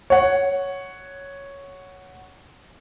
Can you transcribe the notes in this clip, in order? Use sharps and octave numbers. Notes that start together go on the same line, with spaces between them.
C#5 F#5